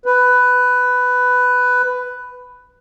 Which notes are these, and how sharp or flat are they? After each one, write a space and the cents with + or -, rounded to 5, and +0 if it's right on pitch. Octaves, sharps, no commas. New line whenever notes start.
B4 +10